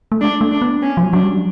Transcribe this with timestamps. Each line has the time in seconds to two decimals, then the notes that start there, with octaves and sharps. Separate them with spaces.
0.12 A3
0.21 G#3 D4
0.41 A3
0.52 D4
0.62 B3
0.82 C#4
0.97 F3
1.03 F#3
1.13 F#3 D4
1.23 G3